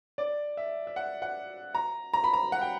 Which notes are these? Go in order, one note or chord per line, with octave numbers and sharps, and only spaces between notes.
D5
E5
E5
F#5
F#5
A#5
A#5
B5
A#5
F#5
G5